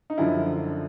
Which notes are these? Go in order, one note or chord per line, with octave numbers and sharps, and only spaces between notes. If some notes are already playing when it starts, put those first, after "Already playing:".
D#4
F#2 D3 F3 E4